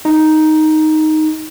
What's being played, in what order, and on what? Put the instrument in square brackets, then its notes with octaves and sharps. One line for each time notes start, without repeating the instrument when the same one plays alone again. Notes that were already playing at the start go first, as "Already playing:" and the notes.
[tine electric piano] D#4